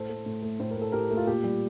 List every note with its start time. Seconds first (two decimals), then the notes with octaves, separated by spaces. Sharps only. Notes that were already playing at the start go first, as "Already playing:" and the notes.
Already playing: A2 A4 C5
0.09 A3
0.26 A2
0.42 A3
0.60 A2 C5
0.71 A#4
0.76 A3
0.82 A4
0.92 A2 G4 A#4
1.10 A3
1.17 F4
1.27 A#2 G4
1.44 G3